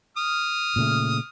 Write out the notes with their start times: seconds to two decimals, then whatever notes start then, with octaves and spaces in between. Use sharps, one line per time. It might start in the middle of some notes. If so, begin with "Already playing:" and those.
0.17 D#6 F6
0.76 A#2 C#3 A3